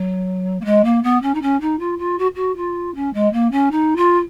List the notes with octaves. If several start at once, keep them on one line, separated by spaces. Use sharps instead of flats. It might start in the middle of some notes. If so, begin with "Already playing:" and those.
Already playing: F#3
A#3
G#3
A#3
B3
C#4
D#4
C#4
D#4
F4
F4
F#4
F#4
F4
C#4
G#3
A#3
C#4
D#4
F4